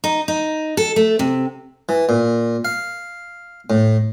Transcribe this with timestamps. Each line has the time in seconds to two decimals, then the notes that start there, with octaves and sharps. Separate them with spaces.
0.04 D#4
0.28 D#4
0.77 A4
0.96 A3
1.19 C3
1.89 E3
2.09 A#2
2.65 F5
3.70 A2